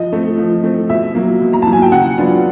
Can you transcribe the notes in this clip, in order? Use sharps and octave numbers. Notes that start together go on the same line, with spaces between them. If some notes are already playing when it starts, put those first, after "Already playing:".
Already playing: F3 D#5
A3 C4
F3
A3 C4
B2 E5
F#3 A#3
B2
A#5
F#3 A#3 A5
G#5
G5
C#3 F#5
F#3 B3 D4 F4